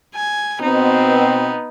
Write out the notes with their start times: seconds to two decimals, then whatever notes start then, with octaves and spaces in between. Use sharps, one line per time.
0.15 G#5
0.61 B2 B3 C4 D#4